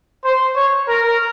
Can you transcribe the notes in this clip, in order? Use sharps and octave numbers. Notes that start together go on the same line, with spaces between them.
C5
C#5
A#4